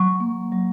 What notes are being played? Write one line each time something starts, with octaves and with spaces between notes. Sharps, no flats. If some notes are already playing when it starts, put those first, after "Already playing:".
Already playing: F#3 C#6
A#3
F#3